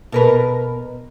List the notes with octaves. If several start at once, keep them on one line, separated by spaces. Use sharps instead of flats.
B2 A#4 B4